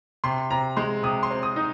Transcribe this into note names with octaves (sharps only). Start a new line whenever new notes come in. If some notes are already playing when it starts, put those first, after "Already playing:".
C3 C6
C3 A#5
G#3 C6
C3 D#6
C6
C4
D#6
D#4